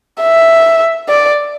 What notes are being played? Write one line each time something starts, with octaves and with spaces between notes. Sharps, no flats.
E5
D5